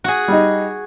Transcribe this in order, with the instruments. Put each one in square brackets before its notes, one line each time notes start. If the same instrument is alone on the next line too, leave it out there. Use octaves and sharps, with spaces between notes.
[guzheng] F#4 G#4
[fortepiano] G3 D#4